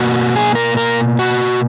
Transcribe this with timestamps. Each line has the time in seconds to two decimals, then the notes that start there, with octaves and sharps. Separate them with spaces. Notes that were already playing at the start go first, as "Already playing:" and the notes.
Already playing: B2 A#3 F#4
0.36 G#4
0.55 A#4
0.77 A#4
1.19 F#4